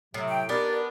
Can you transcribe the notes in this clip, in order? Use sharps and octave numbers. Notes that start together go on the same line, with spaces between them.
A2 C3 F#3
G5
B3 D4 D#4 G4 A#4 D5